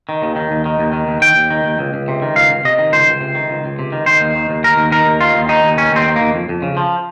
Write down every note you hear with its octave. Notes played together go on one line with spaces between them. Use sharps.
D#3
D#2
D#3
D#2
D#3
D#2
D#3
D#2
D#3 G5
D#2
D#3
D#2
C#2
C#2
C3
D#3
C#2 F5
C#2
C3 D#5
D#3
C#2 C5
C#2
C3
D#3
C#2
C#2
C3
D#3
D#3 C5
D#2
D#3
D#2
D#3 A#4
D#2
D#3 A#4
D#2
D#3 F4
D#2
D#3 D#4
D#2
D#3 C#4
D#2 C4
D#3
D#2 A#3
F2
F2
C#3
F3